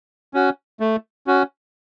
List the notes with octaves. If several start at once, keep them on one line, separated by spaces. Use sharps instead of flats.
C#4 F#4
A3
C#4 F#4